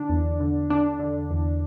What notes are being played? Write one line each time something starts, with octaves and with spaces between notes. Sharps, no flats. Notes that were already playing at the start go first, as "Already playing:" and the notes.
Already playing: D3 D4
E2
D3
D3 D4
D3
E2